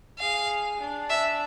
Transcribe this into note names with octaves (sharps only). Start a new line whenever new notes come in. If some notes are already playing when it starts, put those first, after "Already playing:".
G#4 F5
D4
E5